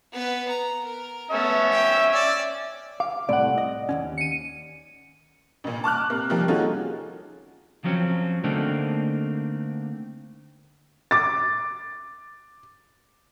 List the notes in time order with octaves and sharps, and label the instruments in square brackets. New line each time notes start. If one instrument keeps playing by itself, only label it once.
[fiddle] B3 B4
A#5
A#4
[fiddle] A3 B3 [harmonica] C#4 E5
[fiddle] G5
D5
[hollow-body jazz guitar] F5 [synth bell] D6
[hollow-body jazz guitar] C2 A2 C3 [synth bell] D5 F#5
[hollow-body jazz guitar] D#5
D#2 G#2 C#4
[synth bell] C#7 D#7
[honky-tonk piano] A1 A#2
A5 D6 F6 F#6
C3 A#3
D#3 F3 G3 A#3
C#4 D#4 F4 F#4 G#4 A4
[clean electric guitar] F3 F#3 C4 C#4
D3 A3 A#3 C4 D4 D#4
[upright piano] D6 A6